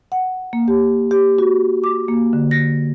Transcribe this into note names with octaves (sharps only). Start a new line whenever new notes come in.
F#5
A#3
G4
G4
F#4
D6
A#3
D3
A#6